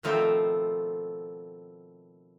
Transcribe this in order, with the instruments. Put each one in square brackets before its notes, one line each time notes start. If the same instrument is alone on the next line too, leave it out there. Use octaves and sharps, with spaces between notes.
[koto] B2 D#3 F3 A3 C4